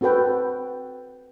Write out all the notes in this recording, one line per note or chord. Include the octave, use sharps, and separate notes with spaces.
C4 F#4 A4 B4 G5